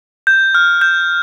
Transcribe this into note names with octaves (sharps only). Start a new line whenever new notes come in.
G6
F6
G6